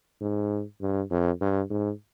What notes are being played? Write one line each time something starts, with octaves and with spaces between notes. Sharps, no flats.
G#2
G2
F2
G2
G#2